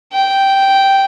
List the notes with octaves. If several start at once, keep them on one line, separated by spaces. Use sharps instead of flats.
G5